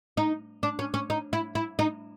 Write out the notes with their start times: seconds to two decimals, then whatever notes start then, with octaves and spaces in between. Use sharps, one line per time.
0.17 D#4
0.63 D4
0.79 C#4
0.94 C#4
1.10 D#4
1.33 E4
1.55 E4
1.79 D#4